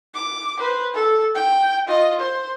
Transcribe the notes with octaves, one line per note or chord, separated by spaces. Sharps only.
D6
B4 C5
A4
G5
F4 D#5
C5